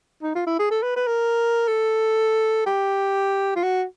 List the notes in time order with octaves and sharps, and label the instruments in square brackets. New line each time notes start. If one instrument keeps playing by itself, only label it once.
[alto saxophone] D#4
F4
E4
G#4
A4
B4
B4
A#4
A4
G4
F4
F#4